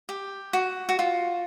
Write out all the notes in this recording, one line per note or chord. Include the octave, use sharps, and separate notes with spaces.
G4
F#4
F#4
F4